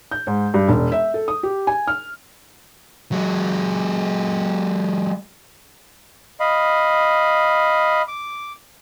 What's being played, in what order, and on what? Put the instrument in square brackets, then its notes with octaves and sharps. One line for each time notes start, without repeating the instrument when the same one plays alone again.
[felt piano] G6
G#2
G2
E1
E5
A4
D#6
G4
G#5
F6
[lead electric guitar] F#3 G#3
[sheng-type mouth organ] D#5 F5 B5
D6